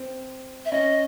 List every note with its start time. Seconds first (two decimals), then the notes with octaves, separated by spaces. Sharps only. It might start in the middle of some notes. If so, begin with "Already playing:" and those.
Already playing: C4
0.65 E5
0.72 C#4 D#5